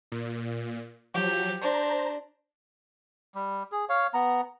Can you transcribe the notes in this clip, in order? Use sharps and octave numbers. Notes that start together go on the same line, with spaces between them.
A#2
F3 F#3 G4
D4 C5 A#5
G3
G#4
C#5 F5
B3 A#5